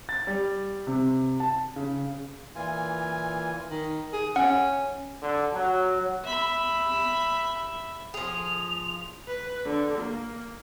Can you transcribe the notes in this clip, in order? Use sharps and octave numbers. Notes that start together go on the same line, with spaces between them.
A6
G3
C3
A5
C#3
A#2 E3 F4 G#5
D#3
G#4
C#4 F#5
D3
F#3
E5 B5
F3 G#4 F7
B4
D3
A#3